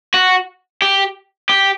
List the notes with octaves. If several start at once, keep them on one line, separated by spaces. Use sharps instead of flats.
F#4
G4
G4